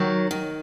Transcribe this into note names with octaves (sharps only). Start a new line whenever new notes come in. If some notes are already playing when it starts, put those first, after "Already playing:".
Already playing: D#3 F#3
D#3